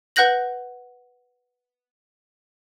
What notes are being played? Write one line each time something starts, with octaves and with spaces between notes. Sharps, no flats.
B4 F#5 F#6 G6 A#6 F#7